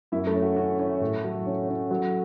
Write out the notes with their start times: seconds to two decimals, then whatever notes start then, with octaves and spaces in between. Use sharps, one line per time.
0.12 F#2 E4 E5
0.27 A3 A4
0.35 C#4
0.42 F#4
0.56 C#4 F#4
0.79 C#4
1.01 A2
1.24 F#3
1.46 C#4
1.68 C#4
1.91 F#3